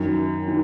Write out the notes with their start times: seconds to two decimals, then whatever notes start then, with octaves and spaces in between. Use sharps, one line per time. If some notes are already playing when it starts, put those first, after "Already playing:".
Already playing: F#2 D#3
0.48 D#3